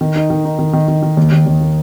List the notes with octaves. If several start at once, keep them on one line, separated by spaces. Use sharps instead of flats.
D#3
D#4
D#3
D#4
D#3
D#3
D#3
D#3
D#2
D#2
D#2
A#3